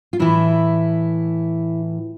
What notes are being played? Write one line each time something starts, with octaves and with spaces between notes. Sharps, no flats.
F4
A2 E3 E4